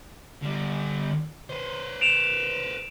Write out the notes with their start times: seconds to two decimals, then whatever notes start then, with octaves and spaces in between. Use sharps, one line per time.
0.42 D3 G3
1.50 B4 C5
2.01 D7 E7 F7